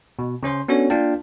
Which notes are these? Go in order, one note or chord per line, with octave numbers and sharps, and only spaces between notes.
B2
C#3 C#4 C5 C6
B3 C#4 D4 F#4 A4 C#5
A#3 D4 F4 F5 G5 A5